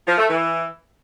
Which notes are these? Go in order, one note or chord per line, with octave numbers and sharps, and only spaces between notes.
F3
A3
E3